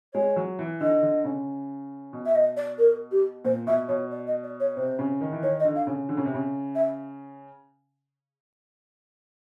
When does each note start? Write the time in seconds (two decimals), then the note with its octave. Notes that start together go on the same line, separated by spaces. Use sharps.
0.14 G#3 C#5
0.36 F#3
0.59 E3
0.81 D3 D#5
1.03 D3
1.25 C#3
2.13 B2
2.26 E5
2.35 D#5
2.57 D5
2.79 A#4
3.12 G4
3.45 A#2 C5
3.67 B2 E5
3.88 B2 C#5
4.11 D5
4.27 D#5
4.44 D5
4.60 C#5
4.76 C3 C5
4.99 C#3
5.21 D#3
5.32 E3
5.43 D#3 C#5
5.60 D#5
5.65 D3
5.76 F5
5.87 C#3
6.09 D3
6.17 C#3
6.26 C3
6.34 C#3
6.75 E5